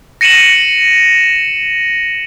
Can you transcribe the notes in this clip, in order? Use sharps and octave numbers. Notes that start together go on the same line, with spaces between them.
A#6 C#7 D#7 E7 F#7